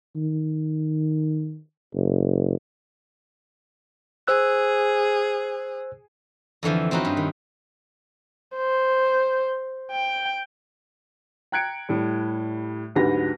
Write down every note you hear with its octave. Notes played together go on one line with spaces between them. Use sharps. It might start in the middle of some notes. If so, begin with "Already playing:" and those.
D#3
F#1
G#4 C5 E6 F#6
F2 D3 E3 F3
C4 C#4 D#4 F#4 B4
G2
D#3
C5
G5
G5 A#5 F#6 G#6 C#7 D7
A2 G3
D2 G#2 F#3 G4 B4 A#6